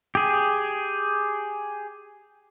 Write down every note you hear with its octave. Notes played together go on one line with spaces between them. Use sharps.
G4 G#4